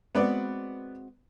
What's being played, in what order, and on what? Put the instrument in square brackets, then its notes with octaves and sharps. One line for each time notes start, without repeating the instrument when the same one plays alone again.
[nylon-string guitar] G#3 C4 F#4 [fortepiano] B3 B4 D5